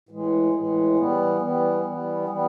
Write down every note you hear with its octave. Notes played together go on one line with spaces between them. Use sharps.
A2 E3 G#3
A2 E3 G#3
E3 G3 B3
E3 G3 B3
E3 G3 B3
E3 G3 B3